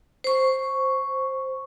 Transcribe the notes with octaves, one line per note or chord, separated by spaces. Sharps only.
C5 C#6